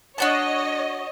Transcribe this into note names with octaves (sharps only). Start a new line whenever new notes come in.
D4 F#4 C#5 D#5 A5